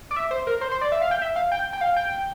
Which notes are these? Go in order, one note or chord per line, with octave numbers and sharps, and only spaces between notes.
D5
E5
C5
A#4
C5
C5
D5
E5
F5
G5
E5
F5
G5
G5
F5
G5